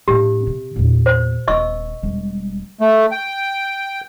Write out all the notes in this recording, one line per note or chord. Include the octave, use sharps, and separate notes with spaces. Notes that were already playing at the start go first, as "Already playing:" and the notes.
A2 D4 G4
C3
E2 A#2
C5
D#1 B3 D#5 C#6 E6
E1 G3
A3
G5